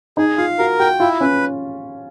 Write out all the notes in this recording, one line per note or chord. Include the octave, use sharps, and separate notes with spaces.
D#4 G#4
F4 F5
F#4 A#4
F#4 G5
E4 F4
C#4 B4